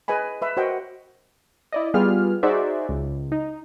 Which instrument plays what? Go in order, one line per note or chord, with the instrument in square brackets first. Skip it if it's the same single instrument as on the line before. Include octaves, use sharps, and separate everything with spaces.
[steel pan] G#4 B4 D#5 G#5 B5
B4 E5 B5
F#4 A#4 C5 D#5 F#5 G5
[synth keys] E4 D5 D#5
G3 B3 F4 G#4 F6
D#4 F#4 G#4 C5 D5 E5
C#2
D#4